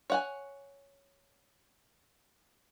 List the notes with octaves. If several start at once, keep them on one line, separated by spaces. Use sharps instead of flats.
C#5 F#5 G#5